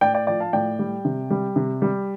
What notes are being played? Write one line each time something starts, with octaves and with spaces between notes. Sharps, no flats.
A2 D5 G5
D5 G5
F3 D5 G5
F5 A5
A2 D5 G5
G3
C3
G3
C3
G3